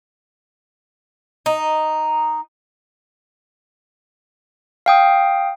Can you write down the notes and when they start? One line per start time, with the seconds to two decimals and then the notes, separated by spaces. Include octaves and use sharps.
1.46 D#4
4.86 F5 G5 D#6